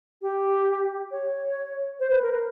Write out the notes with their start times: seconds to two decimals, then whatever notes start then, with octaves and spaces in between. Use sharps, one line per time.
0.22 G4
1.11 C#5
2.00 C5
2.11 B4
2.22 A#4